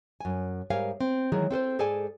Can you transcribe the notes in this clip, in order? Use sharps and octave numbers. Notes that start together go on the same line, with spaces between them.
F#2 G#5
G#2 G3 A#4 C#5 F5 G#5
C4
D#3 E3 F#3 G#3 G#4 A#4
C4 A4 B4 C5
G#2 G#4 A4 D5 G#5